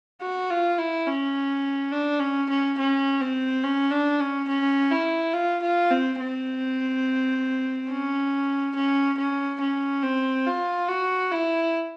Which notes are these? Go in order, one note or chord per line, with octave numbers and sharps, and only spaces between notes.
F#4
F4
E4
C#4
D4
C#4
C#4
C#4
C4
C#4
D4
C#4
C#4
E4
F4
F4
C4
C4
C#4
C#4
C#4
C#4
C4
F4
F#4
E4